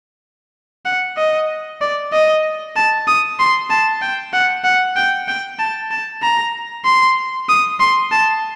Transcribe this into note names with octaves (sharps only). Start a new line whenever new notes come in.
F#5
D#5
D5
D#5
A5
D#6
C6
A5
G5
F#5
F#5
G5
G5
A5
A5
A#5
C6
D#6
C6
A5